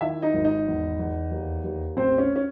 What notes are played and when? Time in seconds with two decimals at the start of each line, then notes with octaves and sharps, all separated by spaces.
0.01 D#3 E4 E5
0.22 D#4 D#5
0.34 G#1
0.45 D#4 D#5
0.67 E2
0.99 E2
1.31 D#2
1.64 D#2
1.97 A1 C4 C5
2.18 C#4
2.36 C#4